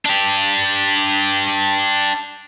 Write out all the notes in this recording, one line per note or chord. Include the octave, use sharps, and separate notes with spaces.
D4 G4